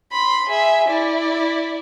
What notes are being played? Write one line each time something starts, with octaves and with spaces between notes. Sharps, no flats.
B5 C6
G#4 E5
E4 D5